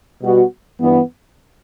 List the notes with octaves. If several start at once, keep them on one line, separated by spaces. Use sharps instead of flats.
B2 G3 B3 F#4
G2 E3 B3